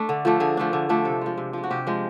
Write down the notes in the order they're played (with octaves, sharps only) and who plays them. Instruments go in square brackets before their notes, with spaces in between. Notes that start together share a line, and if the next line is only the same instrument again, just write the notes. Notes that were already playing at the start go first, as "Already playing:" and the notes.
Already playing: [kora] A3 D4
D3
F3 A3 D4
D3 G#4
F3 A3 D4
D3
F3 A3 D4
C3 A4
F3 G#3
C3
F3 G#3
F#4
C3 G4
F3 G#3